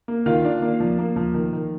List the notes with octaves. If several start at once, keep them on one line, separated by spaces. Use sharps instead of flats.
A#3
D#3 F4 F5
D4
A#3
F3
A#3
F3
D#3
D#3